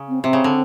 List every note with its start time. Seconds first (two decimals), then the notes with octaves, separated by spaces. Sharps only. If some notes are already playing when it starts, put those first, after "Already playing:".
Already playing: C#3
0.09 C4
0.23 C3 C4
0.33 C#3
0.44 D3